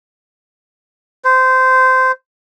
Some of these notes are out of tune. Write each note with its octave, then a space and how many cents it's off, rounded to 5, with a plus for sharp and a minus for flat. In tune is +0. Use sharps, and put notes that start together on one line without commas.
C5 -20